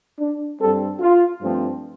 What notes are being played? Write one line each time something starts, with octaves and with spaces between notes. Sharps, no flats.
D4
G2 G3 C4 A4
F4
G2 F3 A3 C4